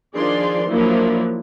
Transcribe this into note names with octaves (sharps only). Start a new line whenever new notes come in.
D#3 F3 D4 G#4 D5 C6
F3 F#3 A#3 D4 E4